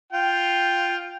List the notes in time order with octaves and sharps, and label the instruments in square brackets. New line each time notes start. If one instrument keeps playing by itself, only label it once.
[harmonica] F4 G5